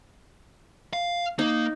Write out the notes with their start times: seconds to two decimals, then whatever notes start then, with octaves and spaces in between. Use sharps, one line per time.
0.93 F5
1.39 A#3 D#4